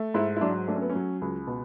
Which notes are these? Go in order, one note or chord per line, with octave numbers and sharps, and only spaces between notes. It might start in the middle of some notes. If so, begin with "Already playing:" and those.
Already playing: A3
G#2 E4
E4
F#3 D4
A3 D4
C#4
B3
C#4
F#3
C#2
B2